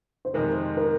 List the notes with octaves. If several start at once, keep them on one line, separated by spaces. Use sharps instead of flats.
C5
F2 C3 D#3 G#3 C4 A#4
A#4